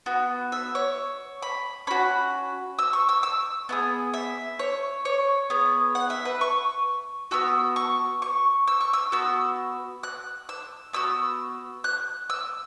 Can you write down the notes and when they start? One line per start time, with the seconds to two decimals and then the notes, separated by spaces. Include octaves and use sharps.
0.06 B3 F#4
0.52 E5
0.75 C#5
1.42 B5
1.87 C#4 F#4 B5
2.79 E6
2.93 C#6
3.09 E6
3.23 E6
3.69 B3 E4 G#4
4.14 E5
4.59 C#5
5.05 C#5
5.50 B3 G#4
5.95 F#5
6.10 E5
6.25 B4
6.41 C#6
7.31 B3 F#4 E6
7.76 C#6
8.22 C#6
8.67 E6
8.81 C#6
8.93 E6
9.12 B3 F#4 E6
10.03 F#6
10.49 E6
10.93 B3 F#4 E6
11.84 F#6
12.30 E6